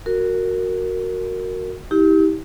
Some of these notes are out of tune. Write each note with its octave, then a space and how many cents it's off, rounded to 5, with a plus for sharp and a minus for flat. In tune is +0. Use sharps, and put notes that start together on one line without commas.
F#4 +0 A#4 -15
E4 -45 G4 +0